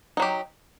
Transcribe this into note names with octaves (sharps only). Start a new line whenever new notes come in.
F#3 D#4 G4